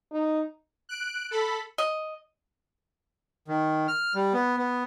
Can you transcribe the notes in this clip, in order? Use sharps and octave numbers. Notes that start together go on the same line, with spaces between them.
D#4
F#6 D7
A4 B5
D#5
D#3
F6
G3
B3
B3